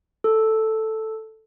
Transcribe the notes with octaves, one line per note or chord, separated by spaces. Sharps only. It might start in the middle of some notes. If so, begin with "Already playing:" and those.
A4